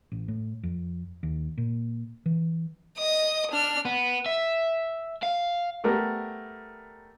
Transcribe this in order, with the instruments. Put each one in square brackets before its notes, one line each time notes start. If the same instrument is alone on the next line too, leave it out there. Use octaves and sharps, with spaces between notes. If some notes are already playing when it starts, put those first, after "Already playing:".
[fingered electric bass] A1
A2
F2
D#2
A#2
E3
[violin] D#5 D#6
D4 F6
[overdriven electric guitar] B3
E5
F5
[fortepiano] G3 A3 B3 A#4